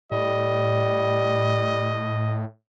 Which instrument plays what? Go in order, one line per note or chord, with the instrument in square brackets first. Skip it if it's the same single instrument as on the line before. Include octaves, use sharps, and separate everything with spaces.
[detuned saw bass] A2 [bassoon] G3 [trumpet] D#5